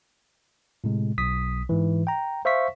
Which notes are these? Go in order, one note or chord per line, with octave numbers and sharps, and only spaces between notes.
A2 C3 G#3
B1 D#6 B6
G#2 E3
G5 A#5
C5 E5 F5 C#6 B6